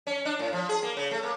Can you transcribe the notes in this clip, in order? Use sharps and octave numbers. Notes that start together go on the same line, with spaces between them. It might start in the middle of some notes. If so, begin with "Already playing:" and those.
C#4
D4
A2
F3
G#4
A#3
C#3
A3
A#3